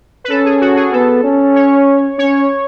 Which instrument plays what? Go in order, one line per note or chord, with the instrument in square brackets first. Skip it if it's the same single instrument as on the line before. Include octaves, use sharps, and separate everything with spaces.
[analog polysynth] B4
[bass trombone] C#4 [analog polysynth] A4
[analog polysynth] G#4
F#4
G#4
[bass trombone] B3 [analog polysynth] A4
[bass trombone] C#4
[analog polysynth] C#5
[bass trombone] C#4 [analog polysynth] C#5